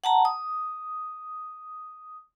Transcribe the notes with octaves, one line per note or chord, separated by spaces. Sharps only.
F#5 A5 A#5
D#6